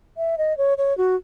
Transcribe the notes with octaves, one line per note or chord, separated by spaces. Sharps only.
E5
D#5
C#5
C#5
F#4